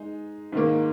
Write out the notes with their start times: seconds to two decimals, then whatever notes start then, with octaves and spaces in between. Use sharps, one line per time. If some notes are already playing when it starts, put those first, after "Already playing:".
Already playing: G#3 D#4
0.52 G#2 D#3 A#3